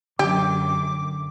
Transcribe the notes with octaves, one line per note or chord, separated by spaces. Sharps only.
F#2 D3 G4 D6